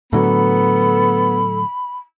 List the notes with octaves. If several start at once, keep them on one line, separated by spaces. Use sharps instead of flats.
A2 D3 F#3 B3 A4 B5